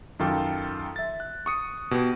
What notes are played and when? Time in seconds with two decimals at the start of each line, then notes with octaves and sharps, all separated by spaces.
0.19 F#2 D#3 F4 A4 G5 D6
0.96 E5 A6
1.20 F#6
1.46 C#6 D#6 C#7
1.91 B2 G4